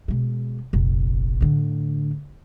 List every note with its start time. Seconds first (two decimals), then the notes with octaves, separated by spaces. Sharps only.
0.08 B2 G#3
0.73 F1 A#1
1.41 A2 D3